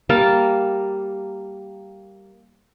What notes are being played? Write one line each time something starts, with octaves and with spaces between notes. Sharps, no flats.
G3 A#3 F5 A5